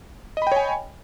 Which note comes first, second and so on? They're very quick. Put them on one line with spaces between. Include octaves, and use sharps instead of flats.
D#5 B5 G5 C#5 G#5